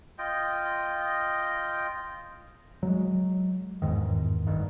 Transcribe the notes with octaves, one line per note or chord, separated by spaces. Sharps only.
F4 D#5 G5
F#3 G#3
G1 E2 G#2 D#3
A1 G2 D#3